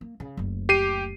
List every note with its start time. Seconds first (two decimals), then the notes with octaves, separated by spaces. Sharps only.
0.01 A#3
0.20 C#3
0.37 F#1 D2
0.69 G4 C7 D#7